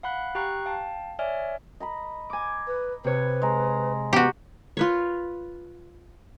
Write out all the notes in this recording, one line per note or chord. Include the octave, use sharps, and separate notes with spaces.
F5 F#5 B5 F#6
G4 G5 A#5 C#6 F#6 C7
F5 G5 A5
C#5 D5 E5 G#5 F6 D7
D#5 A#5 B5
G#5 D6
B4
C3 B4 C#5
G#3 A#5
B3 F#4 G4 G5 A#5
F4 B4 C#5